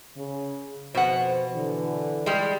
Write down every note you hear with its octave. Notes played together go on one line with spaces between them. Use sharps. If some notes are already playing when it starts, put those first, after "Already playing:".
C#3
F2 B2 C5 F#5
D3 E3
G3 G#3